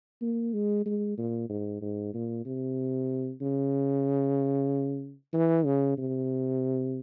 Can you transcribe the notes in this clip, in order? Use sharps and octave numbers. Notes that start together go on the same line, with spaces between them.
A#3
G#3
G#3
A#2
G#2
G#2
A#2
C3
C#3
E3
C#3
C3